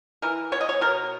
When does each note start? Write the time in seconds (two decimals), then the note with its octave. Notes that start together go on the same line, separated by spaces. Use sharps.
0.22 E3 A#4
0.52 B3 C#5
0.61 D#5
0.69 C#5
0.81 B2 A#4